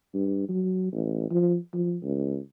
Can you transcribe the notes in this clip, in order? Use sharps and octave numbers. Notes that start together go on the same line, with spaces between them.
G2
F#3
A1
F3
F3
C#2